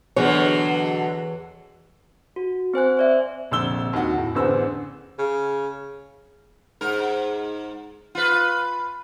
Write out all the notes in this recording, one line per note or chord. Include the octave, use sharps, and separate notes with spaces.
E2 B2 D3 F#3 G#4 C#5
F#4
C4 C5 G#5 F#6
C5 D5 E5
F1 A#1 D3 E6 G7
D#2 F#4
A2
A1 E2 D3 B4 C5 E6
C#3
G#2 A#4
F4 B4